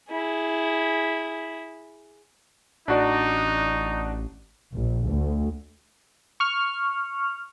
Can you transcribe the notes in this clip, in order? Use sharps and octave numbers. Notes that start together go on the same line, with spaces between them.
E4 G#4
A1 D4 D#4 F#4 D5
A#1
D2
C#6 F6